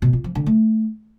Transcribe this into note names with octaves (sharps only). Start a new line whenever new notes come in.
B2
F4
F3
D3
A3